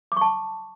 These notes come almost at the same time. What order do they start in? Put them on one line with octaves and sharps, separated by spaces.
D6 C#6 A5